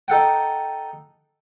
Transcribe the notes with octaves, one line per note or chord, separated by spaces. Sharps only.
D#4 A4 F#5 G5